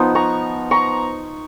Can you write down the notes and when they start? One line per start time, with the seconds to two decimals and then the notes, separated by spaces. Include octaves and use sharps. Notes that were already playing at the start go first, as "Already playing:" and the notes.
Already playing: F3 B3 D#4
0.15 A#5 C#6
0.71 A#5 C#6